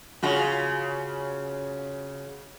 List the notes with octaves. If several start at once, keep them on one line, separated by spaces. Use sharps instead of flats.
C#3 F4 F#4